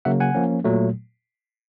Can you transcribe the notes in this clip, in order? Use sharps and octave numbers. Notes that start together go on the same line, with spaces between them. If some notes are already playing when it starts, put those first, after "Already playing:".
C#3 F#3 A#3 E5 F#5
F#5 G#5
F3 A#3 C#4
A#2 F#3 A3